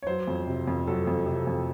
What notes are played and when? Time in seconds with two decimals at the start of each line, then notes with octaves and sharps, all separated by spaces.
0.02 C#5
0.07 F#3 C5
0.28 F2
0.47 C3
0.68 F2
0.87 F#3 A4
1.07 F2
1.26 C3
1.47 F2